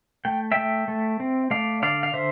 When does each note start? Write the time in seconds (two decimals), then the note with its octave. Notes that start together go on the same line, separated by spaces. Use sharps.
0.25 A3 G5
0.52 A3 E5 G5
0.88 A3
1.20 C4
1.51 A3 D5 F5
1.82 D3 D5 F5
2.03 F5
2.14 D3 C5 E5